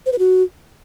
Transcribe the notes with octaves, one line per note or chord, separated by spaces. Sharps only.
C5
B4
F#4